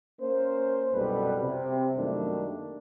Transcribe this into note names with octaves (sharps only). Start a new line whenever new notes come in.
A#3 C#4 A#4 C5
C2 F#2 B2 G3 A4 B4
C3 C4
F#2 D#3 G3 A3 A#3 D4